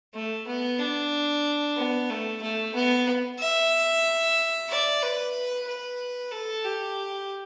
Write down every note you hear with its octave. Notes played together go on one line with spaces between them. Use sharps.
A3
B3
D4
B3
A3
A3
B3
E5
D5
B4
B4
A4
G4